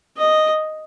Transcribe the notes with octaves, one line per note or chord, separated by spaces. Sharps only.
D#5